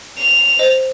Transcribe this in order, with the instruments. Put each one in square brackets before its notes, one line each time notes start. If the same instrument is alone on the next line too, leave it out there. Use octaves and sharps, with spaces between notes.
[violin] F7
[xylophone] C5 D#5